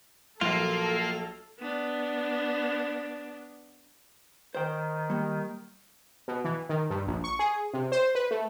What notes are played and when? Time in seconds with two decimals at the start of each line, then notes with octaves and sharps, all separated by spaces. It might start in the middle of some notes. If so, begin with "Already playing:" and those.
0.41 A#1 F#3 A#3 F4 A4
1.59 B3 D4
4.55 D#3 C5 G5
5.10 G3 A#3
6.28 B2
6.45 E3
6.69 D#3
6.90 G2
7.07 A#1
7.24 C#6
7.39 G#4
7.74 C3
7.92 C5
8.15 B4
8.31 A3